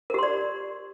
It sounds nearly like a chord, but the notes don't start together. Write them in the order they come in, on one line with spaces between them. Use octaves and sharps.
A#4 G4 C6 D5